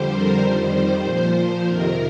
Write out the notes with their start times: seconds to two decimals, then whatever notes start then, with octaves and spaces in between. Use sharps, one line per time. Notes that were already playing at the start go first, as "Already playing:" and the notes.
Already playing: F2 D3 G3 C5
0.12 A#4
0.42 F2 D#3 G3 C5
1.03 A#2 F3
1.65 F2 C3 D#3 A#4